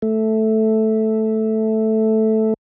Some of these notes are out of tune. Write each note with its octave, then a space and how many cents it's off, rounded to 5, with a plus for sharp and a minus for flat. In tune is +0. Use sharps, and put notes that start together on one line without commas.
A3 -5